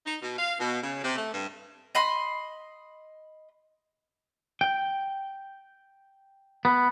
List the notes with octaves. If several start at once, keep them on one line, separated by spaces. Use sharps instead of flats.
D#4
B2
F5
B2
C#3
C3
A3
G2
D#5 B5 C6
G5
B3